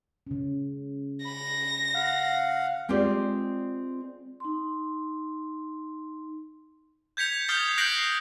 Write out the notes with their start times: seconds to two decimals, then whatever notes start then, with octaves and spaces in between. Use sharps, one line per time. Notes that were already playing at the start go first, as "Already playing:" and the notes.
0.27 C#3 C#4
1.25 B5 A#6
1.94 F5 F#5
2.89 G#3 C4 F4 G4 D5
4.40 D#4 C6
7.17 G6 G#6 B6 C#7 F7
7.48 D#6 F6 G6 A6 C7
7.78 F#6 G6 A#6 C7 D7 F#7